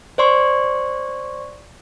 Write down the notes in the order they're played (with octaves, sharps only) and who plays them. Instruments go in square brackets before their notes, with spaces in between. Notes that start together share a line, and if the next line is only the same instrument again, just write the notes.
[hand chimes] C5 D5 C6 C#6